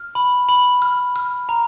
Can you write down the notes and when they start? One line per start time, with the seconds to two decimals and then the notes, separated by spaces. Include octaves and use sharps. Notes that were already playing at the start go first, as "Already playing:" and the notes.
Already playing: F6
0.15 B5
0.49 B5
0.82 F6
1.16 F6
1.49 A#5